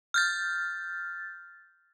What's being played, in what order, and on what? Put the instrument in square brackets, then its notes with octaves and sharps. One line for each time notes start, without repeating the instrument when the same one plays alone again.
[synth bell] F6 G6 A6